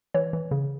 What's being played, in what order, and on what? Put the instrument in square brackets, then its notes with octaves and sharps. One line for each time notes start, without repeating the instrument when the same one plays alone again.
[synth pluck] E3 C#5
E3
C#3